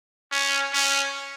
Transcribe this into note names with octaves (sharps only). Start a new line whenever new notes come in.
C#4
C#4